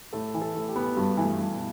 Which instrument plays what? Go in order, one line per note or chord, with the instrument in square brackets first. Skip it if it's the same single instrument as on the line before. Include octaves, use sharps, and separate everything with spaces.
[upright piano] A2 [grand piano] A4
[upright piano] E3
[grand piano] A4
[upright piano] A2
[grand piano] G4
[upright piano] B3
[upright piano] G2 [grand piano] F#4
[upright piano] E3
[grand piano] A3
[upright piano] G2
[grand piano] B2